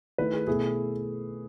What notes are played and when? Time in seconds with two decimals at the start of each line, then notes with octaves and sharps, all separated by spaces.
0.18 D#3 A3 E4 B4
0.33 G#4
0.47 B2 A3 E4 G#4